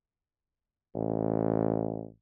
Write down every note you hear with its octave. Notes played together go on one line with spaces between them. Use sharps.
A1